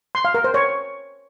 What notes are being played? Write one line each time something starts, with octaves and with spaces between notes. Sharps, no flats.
C6
F5
A#4
C5
C#5